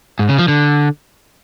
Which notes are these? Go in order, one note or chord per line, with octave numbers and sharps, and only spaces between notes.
G#2
C#3
F3
D3